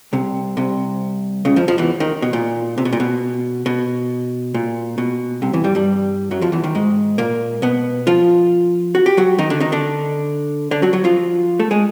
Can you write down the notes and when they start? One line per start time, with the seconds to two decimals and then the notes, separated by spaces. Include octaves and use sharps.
0.13 C2 C3
0.57 C2 C3
1.45 C#2 C#3
1.56 F2 F3
1.68 F2 F3
1.78 E2 E3
2.00 D#2 D#3
2.22 B2
2.33 A#2
2.78 C3
2.85 B2
2.93 A#2
3.00 B2
3.66 B2
4.54 A#2
4.98 B2
5.42 C2 C3
5.53 E2 E3
5.64 G2 G3
5.75 G2 G3
6.31 F#2 F#3
6.41 F2 F3
6.52 E2 E3
6.64 D#2 D#3
6.75 G#2 G#3
7.18 A#2 A#3
7.62 B2 B3
8.07 F3 F4
8.95 F#4
9.06 G4
9.17 F#3 F#4
9.39 D#3 D#4
9.50 D3 D4
9.60 D#3 D#4
9.72 D3 D4
10.71 D3 D4
10.82 F#3 F#4
10.93 F#3 F#4
11.04 F3 F4
11.60 A3 A4
11.71 G#3 G#4